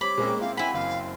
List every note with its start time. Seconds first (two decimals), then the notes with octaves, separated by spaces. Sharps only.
0.01 G3 C4 C#5 B5 D6
0.18 A#2 G#3 A#3 C4 C#4
0.41 C4 E4 F5
0.57 E4 F#5 G#5 B5
0.74 F#1 F5